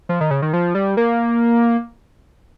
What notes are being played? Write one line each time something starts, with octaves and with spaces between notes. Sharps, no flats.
F3
D#3
C#3
D#3
F3
G3
A#3